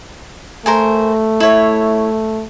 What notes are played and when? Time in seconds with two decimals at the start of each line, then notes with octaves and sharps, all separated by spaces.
0.66 A3 A#4 C5 G#5
1.40 E4 C#5